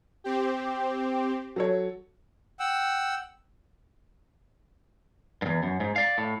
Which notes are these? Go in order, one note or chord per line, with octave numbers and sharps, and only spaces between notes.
C4 G4
F#3 A4 C#5
F#5 G5 E6
E2 G2
F#2
G#2
D5 F5
A2